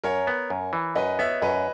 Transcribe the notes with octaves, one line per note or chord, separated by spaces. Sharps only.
F#2 A#4 C#5
B3
F#2
E3
F#2 B4 D#5
B3 C#5 E5
F#2 B4 D#5